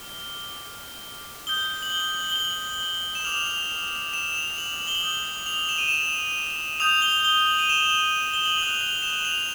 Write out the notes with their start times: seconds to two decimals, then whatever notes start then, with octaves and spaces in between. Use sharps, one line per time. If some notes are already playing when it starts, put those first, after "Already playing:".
Already playing: D6 F6 G7
1.47 D#6 G6 G7
1.82 F#7
1.92 G7
2.30 G7
2.36 F#7
3.15 E7
3.24 D6 F6 F7
4.13 E7
4.36 F7
4.58 F#7
4.80 F#7
4.88 G7
4.95 F#7
5.03 D#6 G6 G7
5.24 F#7
5.46 F7
5.69 E7
5.78 D#7
5.88 E7
6.80 D#6 G6 F7
7.02 G7
7.24 G7
7.47 F#7
7.59 D#7
7.69 E7
8.33 G7
8.45 F#7
8.58 D#6 F#6 F7
8.81 F#7
9.02 E7
9.25 F7